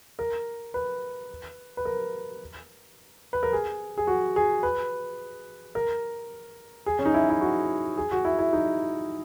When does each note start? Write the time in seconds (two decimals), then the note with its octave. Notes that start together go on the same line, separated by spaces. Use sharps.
0.19 A#4
0.74 B4
1.77 B4
1.85 A#4
3.33 B4
3.43 A#4
3.53 G#4
3.98 G#4
4.07 F#4
4.36 G#4
4.63 B4
5.75 A#4
6.86 G#4
6.99 C#4
7.06 D#4
7.14 E4
7.30 E4
7.41 F#4
7.97 G#4
8.11 F#4
8.25 E4
8.39 E4
8.53 D#4